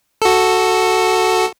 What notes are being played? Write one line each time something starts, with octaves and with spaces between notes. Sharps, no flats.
F#4 A4